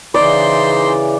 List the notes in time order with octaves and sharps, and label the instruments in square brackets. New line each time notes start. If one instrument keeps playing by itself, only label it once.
[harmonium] C#3 E3 [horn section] D#4 C5 C6 [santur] D5